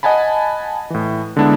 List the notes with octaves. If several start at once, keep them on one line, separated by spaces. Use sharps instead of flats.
D#5 F#5 G#5 A5 B5
A2 E3
D3 G#3 B3 D4 E4